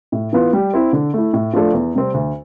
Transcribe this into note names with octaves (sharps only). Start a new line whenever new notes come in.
A2
E3 B3 F4
G3
C4 E4
D3
A3 E4
A2
F3 A3 D4 A4
E2
C3 G3 C4
D2